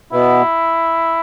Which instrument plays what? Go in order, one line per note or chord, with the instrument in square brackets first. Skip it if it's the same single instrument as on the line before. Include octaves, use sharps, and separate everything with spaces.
[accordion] B2 B3 [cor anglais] E4